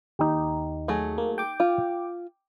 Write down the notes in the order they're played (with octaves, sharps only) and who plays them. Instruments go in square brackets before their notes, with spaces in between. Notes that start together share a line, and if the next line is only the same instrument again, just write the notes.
[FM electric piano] D#2 [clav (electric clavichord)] D#4 G4
[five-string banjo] F#3 A3 G#4
[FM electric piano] A#3
G5 D6
[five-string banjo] F4